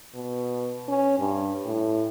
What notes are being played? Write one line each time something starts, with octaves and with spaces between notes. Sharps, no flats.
B2
C#4
G2
A2